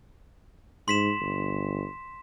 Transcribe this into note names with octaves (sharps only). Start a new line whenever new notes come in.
G#2 C6 B6 E7
G1